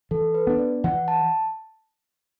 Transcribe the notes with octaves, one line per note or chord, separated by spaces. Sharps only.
E3 A4
B4
B3 D4
D5
E3 F#5
A5